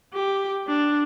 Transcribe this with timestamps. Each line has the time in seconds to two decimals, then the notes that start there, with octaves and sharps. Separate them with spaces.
0.14 G4
0.67 D4